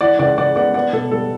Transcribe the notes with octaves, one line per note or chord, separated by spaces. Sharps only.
E3 D5 F#5
C#2 D5 F#5
C#3 D5 F#5
B3 D5 F#5
B3 D5 F#5
B2 A4
G3 A4